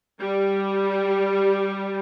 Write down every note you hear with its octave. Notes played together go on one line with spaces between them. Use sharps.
G3